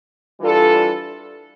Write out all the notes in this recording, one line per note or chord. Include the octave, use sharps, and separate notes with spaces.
E3 G3 D4 F4 A4